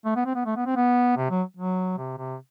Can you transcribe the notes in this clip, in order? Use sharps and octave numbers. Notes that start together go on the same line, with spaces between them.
A3
B3
C4
B3
A3
B3
C4
B3
C3
F#3
F#3
C3
C3